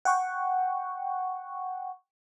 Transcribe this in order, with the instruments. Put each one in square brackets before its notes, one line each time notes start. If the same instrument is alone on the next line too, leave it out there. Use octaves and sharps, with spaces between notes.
[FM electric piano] F#5 G5 C#6